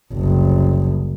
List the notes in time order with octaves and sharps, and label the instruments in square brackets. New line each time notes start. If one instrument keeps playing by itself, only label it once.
[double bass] F#1 C2